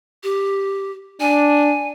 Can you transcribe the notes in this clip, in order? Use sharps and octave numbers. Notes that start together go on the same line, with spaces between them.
G4
D4 G#5